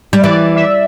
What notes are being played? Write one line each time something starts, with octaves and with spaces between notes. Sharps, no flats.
G3
E3 D5
E5